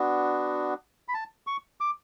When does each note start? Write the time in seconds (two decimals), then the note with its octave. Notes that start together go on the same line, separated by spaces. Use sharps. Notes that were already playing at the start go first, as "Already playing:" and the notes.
Already playing: B3 D4 F#4
1.08 B5
1.14 A5
1.47 C#6
1.81 D6